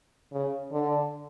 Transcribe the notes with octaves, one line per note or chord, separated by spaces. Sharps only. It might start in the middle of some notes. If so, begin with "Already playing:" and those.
C#3
D3